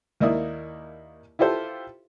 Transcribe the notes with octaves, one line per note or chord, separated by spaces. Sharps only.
D#2 A#3 D#4 E4 D5 D#6
E4 F4 G4 A4 C5